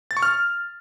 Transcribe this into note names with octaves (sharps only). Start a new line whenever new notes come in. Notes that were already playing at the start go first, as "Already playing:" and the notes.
A6
C#6
F6